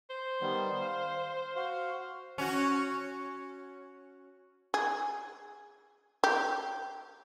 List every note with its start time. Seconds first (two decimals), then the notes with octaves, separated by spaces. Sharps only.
0.10 C5
0.41 D#3 G3 B3
0.82 F5
1.56 F#4 C5 F5
2.38 C#4 F#4
4.74 G#4
6.24 G4